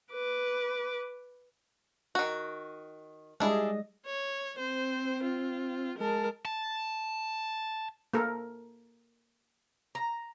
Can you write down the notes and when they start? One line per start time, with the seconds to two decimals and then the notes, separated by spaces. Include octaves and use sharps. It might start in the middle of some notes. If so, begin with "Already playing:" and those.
0.12 B4 D6
2.15 D#3 F#4
3.40 G3 G#3 D4 E4 G#4 D#5
4.06 C#5
4.58 C4 C5
5.23 F4
5.98 G#3 A#4 A5
6.45 A5
8.14 A#3 A4 A#4
9.95 A#5